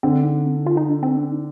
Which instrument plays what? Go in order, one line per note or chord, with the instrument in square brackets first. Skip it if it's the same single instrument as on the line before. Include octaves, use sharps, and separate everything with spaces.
[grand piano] D3 [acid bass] C4
[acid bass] D#4
C4
D#4
F4
D#4
D4
C4
D4
D#4